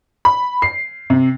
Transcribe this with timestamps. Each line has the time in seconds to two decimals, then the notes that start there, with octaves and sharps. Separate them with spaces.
0.25 B5
0.62 C7
1.10 C3